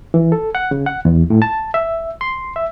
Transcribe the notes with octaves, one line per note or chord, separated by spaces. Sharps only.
E3
A4
F#5
C#3
F#5
E2
A2
A5
E5
C6
E5